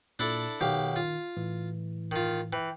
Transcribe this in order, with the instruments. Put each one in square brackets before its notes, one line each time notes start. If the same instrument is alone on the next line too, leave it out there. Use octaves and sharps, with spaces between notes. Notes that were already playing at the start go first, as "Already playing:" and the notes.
[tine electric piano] A#2 [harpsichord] D4 E4 A4
[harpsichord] B1 G4 F5 [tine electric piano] D#3
[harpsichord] F4
[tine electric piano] A2 E3
[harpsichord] D#3 F4
[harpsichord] E3 [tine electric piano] G5